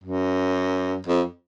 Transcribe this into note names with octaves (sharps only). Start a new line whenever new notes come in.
F#2
F2